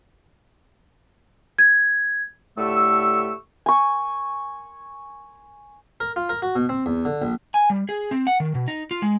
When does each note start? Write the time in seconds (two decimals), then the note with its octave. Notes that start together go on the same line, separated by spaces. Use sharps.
1.59 G#6
2.58 A2 D3 A3 G4 C#6 E6
3.66 G#5 C#6
6.00 A#4
6.16 F4
6.29 A#4
6.42 F#4
6.56 B2
6.69 C4
6.86 E2
7.05 D3
7.22 A#1
7.54 G#5
7.70 G3
7.89 G#4
8.11 C4
8.27 F#5
8.40 D#3
8.55 B2
8.68 D#4
8.91 F4
9.02 G#3